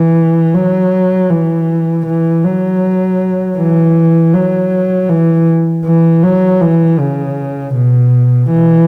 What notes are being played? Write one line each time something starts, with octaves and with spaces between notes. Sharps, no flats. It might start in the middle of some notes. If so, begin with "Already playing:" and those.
Already playing: E3
F#3
E3
E3
F#3
E3
F#3
E3
E3
F#3
E3
C#3
B2
E3